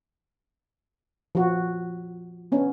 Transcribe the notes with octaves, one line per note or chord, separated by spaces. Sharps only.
F3 F#4
B3 C#4 D4